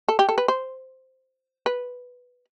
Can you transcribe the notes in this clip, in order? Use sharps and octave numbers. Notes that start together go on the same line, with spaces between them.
A4
G4
A4
B4
C5
B4